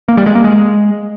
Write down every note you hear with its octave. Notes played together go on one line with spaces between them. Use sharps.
A#3
G3
G#3
A#3
G#3